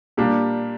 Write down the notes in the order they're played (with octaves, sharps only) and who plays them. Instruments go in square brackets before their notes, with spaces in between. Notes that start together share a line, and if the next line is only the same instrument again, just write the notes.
[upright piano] A#2 G3 A#3 D4 G4